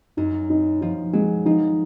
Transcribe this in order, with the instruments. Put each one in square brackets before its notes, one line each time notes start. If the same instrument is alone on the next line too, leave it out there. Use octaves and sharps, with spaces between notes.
[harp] F#2 [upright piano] D#4
[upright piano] D#4
[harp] F3 [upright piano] D#4
[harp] F#3 [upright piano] G#3
[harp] F3 [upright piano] D#4